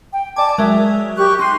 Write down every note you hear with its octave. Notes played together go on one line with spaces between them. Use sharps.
G5
D5 G#5 A5 D6
F#3 G#3 A#4 E5
G4 C#6 F#6
D#4 C6 F#6 C7